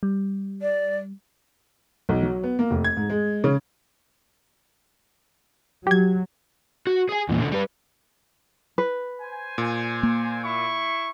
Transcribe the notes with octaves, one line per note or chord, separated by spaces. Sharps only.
G3
D5
B1
F#3
B3
A#3
F1
G#6
G#2
G#3
C#3
F#3 G4 G#6
F#4
G#4 G#5
E2 A#2
C2 D3
G3 B4
B4
C5 G#5
A#2
A#3
E4 B5 C#6